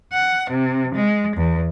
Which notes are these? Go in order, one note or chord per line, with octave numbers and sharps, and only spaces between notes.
F#5
C3
G#3
E2